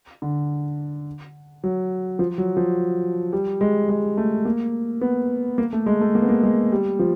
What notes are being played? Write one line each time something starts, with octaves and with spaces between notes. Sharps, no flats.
D3
F#3
F3
F#3
F3
G3
G#3
G#3
A3
A#3
B3
A#3
A3
G#3
A3
A#3
B3
A#3
G#3
G3
F3